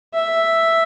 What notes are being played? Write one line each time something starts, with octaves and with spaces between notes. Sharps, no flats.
E5